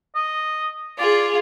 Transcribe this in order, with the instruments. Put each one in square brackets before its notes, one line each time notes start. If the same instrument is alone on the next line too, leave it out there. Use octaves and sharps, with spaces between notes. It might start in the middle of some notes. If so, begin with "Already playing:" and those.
[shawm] D#5
[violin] F4 G#4 [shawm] D5